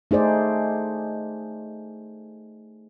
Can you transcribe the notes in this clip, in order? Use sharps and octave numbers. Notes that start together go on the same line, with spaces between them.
A3 D#4 G#4 C5 D5